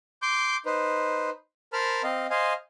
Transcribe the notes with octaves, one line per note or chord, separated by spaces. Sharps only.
C6 D6 G6
D#4 B4 C5
A#4 C5 A5 B5 F6
C4 D#5 F5
C5 D#5 F5 G#5